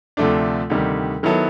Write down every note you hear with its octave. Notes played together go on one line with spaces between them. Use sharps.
D2 C3 F3 A3 D4
D2 C3 D#3 G3
D#3 F#3 B3 E4 A4